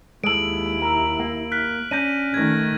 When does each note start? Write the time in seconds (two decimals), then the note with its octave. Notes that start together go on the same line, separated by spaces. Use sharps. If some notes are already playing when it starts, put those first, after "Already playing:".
0.24 D#2 G#3 E4 A4 D7 F#7
0.82 A#4
1.20 A#3
1.52 F6 F#6 B6
1.91 C#4 D4 G6 A#6 D#7
2.34 D#3 A3 G#6 A#6